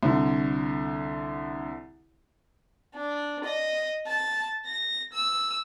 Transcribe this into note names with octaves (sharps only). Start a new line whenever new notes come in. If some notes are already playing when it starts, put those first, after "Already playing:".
C2 D3
D4
D#5
A5
A#6
E6